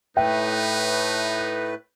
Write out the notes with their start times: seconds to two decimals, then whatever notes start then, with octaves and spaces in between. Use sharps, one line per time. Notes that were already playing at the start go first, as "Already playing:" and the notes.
0.17 A2 A3 D#4 B4 E5 G5